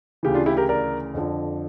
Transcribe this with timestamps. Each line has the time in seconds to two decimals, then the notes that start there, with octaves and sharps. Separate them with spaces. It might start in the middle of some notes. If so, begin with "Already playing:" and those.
0.23 D2 C#3 E3 G4
0.34 D4 F4
0.46 E4 G4
0.57 G4 A#4
0.69 A#4 D5
1.14 F2 D3 F3